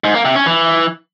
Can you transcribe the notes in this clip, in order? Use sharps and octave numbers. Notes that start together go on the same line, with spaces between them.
G#2
A#3
C3
C#4
E3